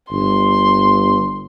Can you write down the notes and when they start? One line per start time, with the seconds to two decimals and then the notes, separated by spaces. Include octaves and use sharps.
0.11 G1 C6